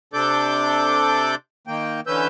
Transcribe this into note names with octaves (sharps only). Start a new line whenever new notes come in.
C3 D4 A4 D5 D6 G6
D#3 A#3 G5
D3 E3 C#4 B4 E6 G6